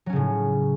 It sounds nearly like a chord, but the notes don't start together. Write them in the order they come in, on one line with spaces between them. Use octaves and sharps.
F#3 C#4 C#3 A2